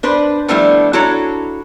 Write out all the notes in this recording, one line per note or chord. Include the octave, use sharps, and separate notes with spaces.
D4 B4 C5
F3 G3 A3 B3 D4 E4
D4 E4 F#4 A4 C#5 A#5